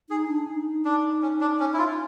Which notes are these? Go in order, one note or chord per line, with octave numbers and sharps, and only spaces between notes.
D#4 G#4
D4
D#4
D4
C#4
D4
C#4
E4
F4